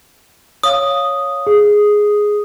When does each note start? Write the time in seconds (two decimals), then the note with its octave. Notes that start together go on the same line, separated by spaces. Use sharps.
0.63 C#5 F5 D#6
1.47 G#4